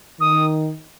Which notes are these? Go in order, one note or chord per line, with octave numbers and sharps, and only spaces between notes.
D#3 D#6